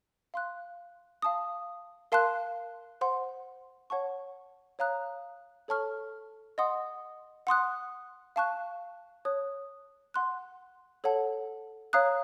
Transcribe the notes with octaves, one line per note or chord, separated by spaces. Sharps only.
F5 C6 F#6
F5 A5 D#6
A#4 F5 A5 C6 F#6
C5 F#5 C6
C#5 F#5 A5 C#6
C#5 F5 A#5 D#6 F#6
A4 C#5 A5 C#6 F6
D#5 F#5 C6 D#6
F#5 C6 D#6 F#6
F5 A5 C#6 F#6
C#5 A5 D#6 F#6
F#5 C6 F#6
A4 C#5 F#5 A5
C#5 F5 A#5 D#6 F#6